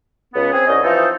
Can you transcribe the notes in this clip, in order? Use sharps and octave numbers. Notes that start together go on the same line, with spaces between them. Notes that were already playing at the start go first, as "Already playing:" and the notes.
C#2 B3
C4 G#4
C2 C#4 D#5
E3 F3 C4 D#4 A4